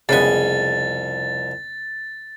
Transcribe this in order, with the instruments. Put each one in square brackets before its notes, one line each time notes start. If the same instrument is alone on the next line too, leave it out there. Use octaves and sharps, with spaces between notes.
[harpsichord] C2 F2 G#5 [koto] C#3 G#3 B3 [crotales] A6